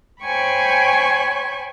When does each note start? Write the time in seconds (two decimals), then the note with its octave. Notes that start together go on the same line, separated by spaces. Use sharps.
0.23 C5 C#5 G5 G#5 B5 C#6